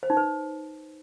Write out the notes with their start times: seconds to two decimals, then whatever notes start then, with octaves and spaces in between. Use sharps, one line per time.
0.03 C5
0.10 D#4
0.17 B4